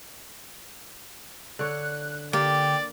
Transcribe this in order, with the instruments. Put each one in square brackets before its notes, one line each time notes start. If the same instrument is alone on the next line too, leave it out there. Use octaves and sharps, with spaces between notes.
[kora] D3 C#5 [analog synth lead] F#6
[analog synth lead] D3 [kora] A#3 [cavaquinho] G4 [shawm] D5